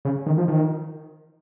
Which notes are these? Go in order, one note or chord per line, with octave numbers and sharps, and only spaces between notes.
C#3
D#3
F3
D#3